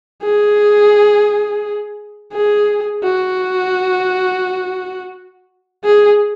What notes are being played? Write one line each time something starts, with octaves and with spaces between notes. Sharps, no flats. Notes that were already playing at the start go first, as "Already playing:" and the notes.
G#4
G#4
F#4
G#4